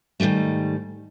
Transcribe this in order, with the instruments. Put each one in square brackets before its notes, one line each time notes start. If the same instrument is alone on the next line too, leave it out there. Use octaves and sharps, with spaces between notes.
[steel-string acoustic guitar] G#2 D#3 F#3 G3 A3